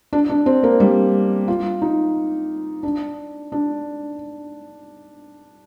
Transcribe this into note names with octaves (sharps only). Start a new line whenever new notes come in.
D4
D4
C4
A#3
G3
F4
D#4
D4
D4